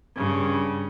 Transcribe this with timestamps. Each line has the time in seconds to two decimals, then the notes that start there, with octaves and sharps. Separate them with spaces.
0.16 G2 C#3